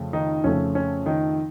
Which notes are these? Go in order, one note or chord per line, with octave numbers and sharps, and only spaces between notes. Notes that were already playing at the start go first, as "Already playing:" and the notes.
Already playing: F2 C#3 A3
D#3 D#4
F2 C#3 A3 C#4
C#4
D#3 D#4